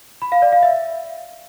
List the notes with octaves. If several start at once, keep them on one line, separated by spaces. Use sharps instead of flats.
B5
F5
D5
F5
E5